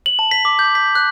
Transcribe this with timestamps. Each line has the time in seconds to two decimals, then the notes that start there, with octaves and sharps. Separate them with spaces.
0.06 F#7
0.19 A5
0.31 B6
0.45 D6
0.59 G6
0.75 B6
0.95 F#6